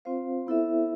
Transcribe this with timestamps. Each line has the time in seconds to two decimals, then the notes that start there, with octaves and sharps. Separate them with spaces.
0.05 C4 F4 C5 F5
0.47 B3 E4 A4 C5 E5